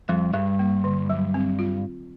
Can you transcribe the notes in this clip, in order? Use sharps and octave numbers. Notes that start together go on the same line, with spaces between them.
F2 G3
G2 G3
A#3
D3
F#3
C4
F4